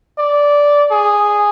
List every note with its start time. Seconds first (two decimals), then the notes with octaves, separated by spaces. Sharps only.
0.18 D5
0.92 G#4